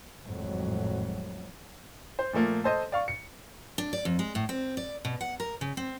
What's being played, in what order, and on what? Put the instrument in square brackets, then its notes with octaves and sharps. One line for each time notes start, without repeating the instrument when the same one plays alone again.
[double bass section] G#1 F2 A2 F#3
[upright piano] C5
A#2 F3 A3 A#3
A4 C5 D#5
D5 F5 C#6
C#7
[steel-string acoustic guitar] D4
D5
F2
G#3
A2
C4
D5
B2
F#5
A#4
C#3
C4